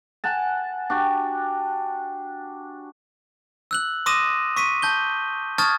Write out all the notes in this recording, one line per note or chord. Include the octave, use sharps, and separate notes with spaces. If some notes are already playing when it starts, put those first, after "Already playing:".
F#5 G#5 A5
D4 F#4 G4
E6 F#6 F#7
C6 D6 D#6 A#6 D#7 E7
C#6 B6 D#7
A5 G6 G7
A5 C#6 D#6 F6 G#6 A6